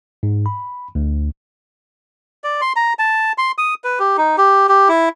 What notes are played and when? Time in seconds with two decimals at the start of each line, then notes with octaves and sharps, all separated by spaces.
0.23 G#2
0.46 B5
0.95 D2
2.44 D5
2.61 C6
2.76 A#5
2.99 A5
3.38 C6
3.58 D#6
3.84 B4
3.99 G4
4.17 D#4
4.38 G4
4.69 G4
4.89 E4